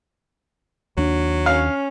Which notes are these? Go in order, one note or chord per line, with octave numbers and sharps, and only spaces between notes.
D#2 F#3 D4
C#4 F5